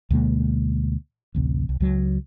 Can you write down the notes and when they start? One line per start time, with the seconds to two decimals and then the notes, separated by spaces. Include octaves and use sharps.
0.10 D2 B2 G#3 A#3
1.35 A1 D2 C3
1.69 C2
1.80 C#2 F#3